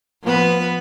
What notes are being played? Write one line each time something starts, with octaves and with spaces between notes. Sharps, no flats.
F3 B3 B4